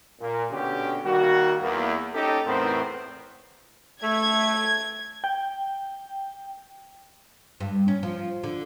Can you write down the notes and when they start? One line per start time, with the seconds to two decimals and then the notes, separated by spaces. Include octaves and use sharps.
0.21 A#2
0.52 B2 D3 C#4 G4
1.05 D#3 G3 A#3 F#4
1.62 E2 A#3
2.14 C#4 D#4 G4 A4
2.47 E2 A2 B3 C4 A#4 C5
4.03 A3 G#6
5.24 G5
7.60 G2
7.88 C#4
8.03 F3
8.44 D3